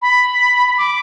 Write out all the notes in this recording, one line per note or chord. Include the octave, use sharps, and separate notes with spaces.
B5
D6